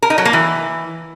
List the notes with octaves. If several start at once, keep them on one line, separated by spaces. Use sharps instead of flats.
A#4
D#4
F#3
A#3
E3